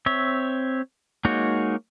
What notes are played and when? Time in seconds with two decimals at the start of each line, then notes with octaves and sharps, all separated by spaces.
0.06 C4 C#5 E5
1.25 G#3 A#3 D#4 F#4 C#5